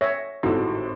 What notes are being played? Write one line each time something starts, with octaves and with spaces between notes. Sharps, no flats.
C#5 E5 A#6
G#1 A2 D#4 F#4 G4 A4